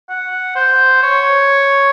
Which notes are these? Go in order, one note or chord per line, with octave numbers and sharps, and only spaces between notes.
F#5
C5
C#5